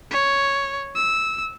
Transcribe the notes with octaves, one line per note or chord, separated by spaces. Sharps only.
C#5
E6